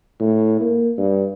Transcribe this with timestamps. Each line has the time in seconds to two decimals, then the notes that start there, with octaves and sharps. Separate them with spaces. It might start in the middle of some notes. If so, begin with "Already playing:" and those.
0.20 A2
0.61 A#3
0.98 G2